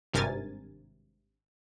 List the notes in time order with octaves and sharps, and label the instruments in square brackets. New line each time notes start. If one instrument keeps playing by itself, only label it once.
[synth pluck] G#1 G2 C3 A#4 G#5 A6